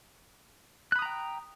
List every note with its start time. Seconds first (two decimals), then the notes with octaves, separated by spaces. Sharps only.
0.92 F#6
0.96 B5
0.99 D#6
1.02 A#5
1.06 G5